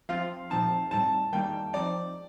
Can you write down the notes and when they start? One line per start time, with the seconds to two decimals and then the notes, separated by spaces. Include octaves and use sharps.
0.09 F3 C4 F4 F5
0.50 A#2 F3 C4 D#4 A5
0.91 A2 G3 C4 D#4 A5
1.33 D#3 G3 A#3 D#4 G5
1.73 F3 C4 D#4 D5